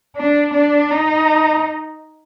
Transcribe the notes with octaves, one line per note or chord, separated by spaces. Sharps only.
D4
D4
D#4